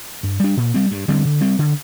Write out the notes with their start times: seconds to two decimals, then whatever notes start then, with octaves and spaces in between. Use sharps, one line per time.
0.23 G2
0.40 G3 D4
0.57 A#2
0.74 G3 C4
0.91 G2
1.08 D3 G3 C4
1.25 D3
1.41 G3 C4
1.59 D3